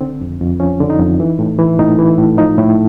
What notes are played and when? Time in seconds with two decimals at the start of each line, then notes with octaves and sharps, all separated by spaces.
0.01 D3 C4
0.21 F2
0.41 F2
0.60 F3 C#4
0.81 D3
0.90 D#4
0.99 F2
1.20 E3
1.39 A2
1.59 E3
1.78 A2 D#4
1.99 E3
2.18 A2
2.38 F3 D#4
2.58 A2